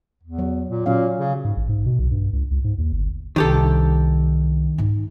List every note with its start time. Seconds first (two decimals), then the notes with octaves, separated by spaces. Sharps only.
0.23 E2
0.39 F#3
0.67 A#2
0.86 A#2 F#3 C#4 F5
1.17 C#3
1.45 G#2
1.57 A1
1.69 G#2
1.86 B2
1.99 B1
2.11 G2
2.33 C#2
2.51 C#2
2.64 G#2
2.78 D#2
2.92 G1
3.36 C2 D#3 D4 G4 A4
4.78 G#2 D#4